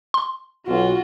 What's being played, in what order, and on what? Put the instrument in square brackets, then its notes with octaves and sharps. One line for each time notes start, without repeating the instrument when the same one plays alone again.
[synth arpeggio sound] C6
[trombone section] B1 [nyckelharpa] F4 [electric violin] F#4